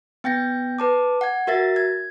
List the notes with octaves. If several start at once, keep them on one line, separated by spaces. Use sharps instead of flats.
B3 G5 G6 A#6
B4 A5 D6
F#5 G#6
F#4 A#4 E5 A6
G#6